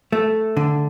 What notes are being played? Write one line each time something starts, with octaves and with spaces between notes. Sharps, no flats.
A3
D3